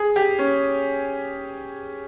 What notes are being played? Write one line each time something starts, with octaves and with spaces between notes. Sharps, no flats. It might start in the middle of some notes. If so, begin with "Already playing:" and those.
Already playing: G#4
G4
C#4